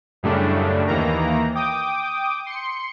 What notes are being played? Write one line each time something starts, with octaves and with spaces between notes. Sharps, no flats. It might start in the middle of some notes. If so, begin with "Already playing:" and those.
F#2 A2 C#3 G3 A3 D4
D#2 D#3 E3 A#3 A#5
G5 D6 D#6
C6 C#7